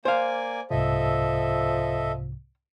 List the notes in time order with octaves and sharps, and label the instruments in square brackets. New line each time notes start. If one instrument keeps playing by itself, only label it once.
[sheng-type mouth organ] A#3 D5 G#5 [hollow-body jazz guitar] C5 F5
[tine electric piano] C2 G#2 C3 [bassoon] F3 [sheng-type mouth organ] A4 D#5 E5